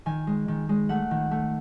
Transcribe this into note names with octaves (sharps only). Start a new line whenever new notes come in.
D#3 G#5
G#3
D#3
G#3
A3 F#5
D#3
A3